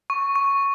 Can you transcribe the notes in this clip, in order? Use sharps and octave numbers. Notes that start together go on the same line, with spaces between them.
C#6
C#6